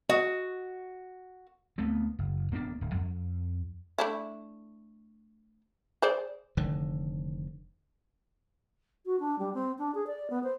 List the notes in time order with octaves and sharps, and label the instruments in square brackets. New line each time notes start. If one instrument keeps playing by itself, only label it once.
[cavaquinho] F#4 [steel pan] D#5
[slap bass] D2 A3 B3 C4
F#1
D#1 A#3 B3 D4
D1
F2
[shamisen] A3 D4 E4
G#4 C5 D5
[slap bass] F1 D3 D#3
[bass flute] F#4
D4
G3
C4
D4
G#4
D5
B3
C5